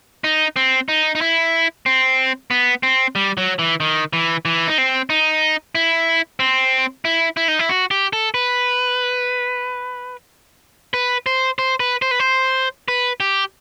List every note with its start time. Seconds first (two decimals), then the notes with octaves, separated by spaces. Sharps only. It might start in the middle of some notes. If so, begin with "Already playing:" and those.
0.24 D#4
0.56 C4
0.89 D#4
1.15 D#4
1.21 E4
1.86 C4
2.51 B3
2.83 C4
3.15 G3
3.37 F#3
3.59 E3
3.80 D#3
4.13 E3
4.45 E3
4.68 D#4
4.78 C4
5.10 D#4
5.75 E4
6.40 C4
7.05 E4
7.37 E4
7.48 D#4
7.59 E4
7.69 F#4
7.91 G4
8.13 A4
8.34 B4
10.94 B4
11.26 C5
11.59 C5
11.80 B4
12.02 C5
12.11 B4
12.20 C5
12.88 B4
13.20 G4